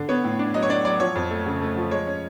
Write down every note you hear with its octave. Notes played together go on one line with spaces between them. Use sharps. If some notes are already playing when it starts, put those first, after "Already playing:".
Already playing: D3
B3 C#5
A2
D4
F#3 D#5
C#5
D4 D5
F#3 D5
F3 C#5
F2
A3
C#3
A3
F3
G#3 C#5
C#4